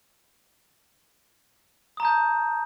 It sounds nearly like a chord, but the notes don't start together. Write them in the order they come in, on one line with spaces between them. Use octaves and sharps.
D#6 A#5 A5 G6